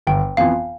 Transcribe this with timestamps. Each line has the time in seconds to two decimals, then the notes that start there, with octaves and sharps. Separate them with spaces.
0.07 G1 G5
0.37 F2 E3 B3 F4 F5